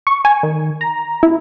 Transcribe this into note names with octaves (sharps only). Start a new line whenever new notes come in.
C#6
G#5
D#3
A#5
E4